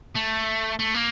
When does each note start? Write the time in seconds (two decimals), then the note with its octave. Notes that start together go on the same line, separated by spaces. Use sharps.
0.16 A3
0.79 A3
0.95 A#3